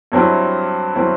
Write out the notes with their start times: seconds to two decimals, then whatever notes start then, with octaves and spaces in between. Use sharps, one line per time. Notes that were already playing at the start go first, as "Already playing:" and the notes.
0.12 G2 F#3 C4 E4
0.95 F#3 C4 E4